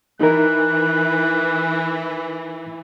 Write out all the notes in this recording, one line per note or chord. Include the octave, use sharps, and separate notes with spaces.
E3 D#4 A#4 F#6